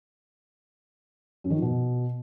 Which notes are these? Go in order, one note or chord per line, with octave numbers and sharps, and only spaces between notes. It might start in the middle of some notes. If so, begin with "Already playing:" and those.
F#2
D#3
F3
B2